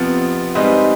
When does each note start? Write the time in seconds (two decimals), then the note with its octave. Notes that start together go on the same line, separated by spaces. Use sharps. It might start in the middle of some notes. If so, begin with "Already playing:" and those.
Already playing: F2 C3 F3 B3
0.55 G#2 G3 C4 D#4 B4